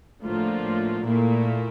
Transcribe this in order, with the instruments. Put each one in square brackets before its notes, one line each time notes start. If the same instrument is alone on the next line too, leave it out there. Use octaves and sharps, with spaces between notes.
[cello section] A2 [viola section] D3 F3 A#3 F4
[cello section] A2
[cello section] A#2 [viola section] A3 E4 A#4